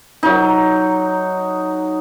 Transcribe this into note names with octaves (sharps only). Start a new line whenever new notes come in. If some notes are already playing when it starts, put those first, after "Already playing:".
F#3 D#4